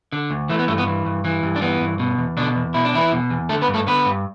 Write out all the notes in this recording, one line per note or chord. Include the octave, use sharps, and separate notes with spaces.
D3
D2
E3 A3
B3
G2 A3
B3
E3
G2
E3
G2
D4
E3 B3
G2
B2
E2
B2 D3 D4
E2
B2 E4
D4
E2 E3 E4
B2
E2
D3 A3 A4
B3 B4
G2
A3 A4
D3 B3 B4
G2